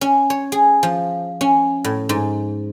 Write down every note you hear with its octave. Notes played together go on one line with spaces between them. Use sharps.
C#4
C#5
G#4
F3
C#4
A2
G#2